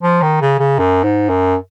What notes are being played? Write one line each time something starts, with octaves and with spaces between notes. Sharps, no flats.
F3
D#3
C#3
C#3
F#2
G#2
F#2